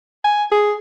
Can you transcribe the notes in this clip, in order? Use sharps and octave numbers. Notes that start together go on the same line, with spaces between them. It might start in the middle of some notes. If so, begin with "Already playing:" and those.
G#5
G#4